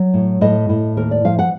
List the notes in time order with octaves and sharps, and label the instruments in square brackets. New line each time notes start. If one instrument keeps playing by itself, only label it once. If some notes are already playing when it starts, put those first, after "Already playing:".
Already playing: [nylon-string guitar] F#3
A2
A2 D#5
A2
D#2 A#4
D5
F3 F5
F#5